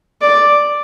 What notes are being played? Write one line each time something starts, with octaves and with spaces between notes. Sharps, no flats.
D5